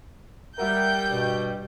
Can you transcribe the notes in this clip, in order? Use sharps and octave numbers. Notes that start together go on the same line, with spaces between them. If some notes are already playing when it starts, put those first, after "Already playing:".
G3 A#4 E5 F#5 G5 G6
G2 B2